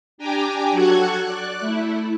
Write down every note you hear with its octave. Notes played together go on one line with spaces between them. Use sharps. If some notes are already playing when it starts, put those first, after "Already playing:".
D4 G4 G5 G#5 A#5 D6
F#3 F#4 A4 C#6 F#6 G#6
D5 F#6
A3 E4